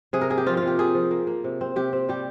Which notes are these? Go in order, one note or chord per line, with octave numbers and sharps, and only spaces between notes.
C3 G#4
A#4
A#3 G#4
G4
F3 F4
F4
C3
G4
A#3 G#4
F3
A#3
A#3
C3
C4
C3 G4
C4
G3 G4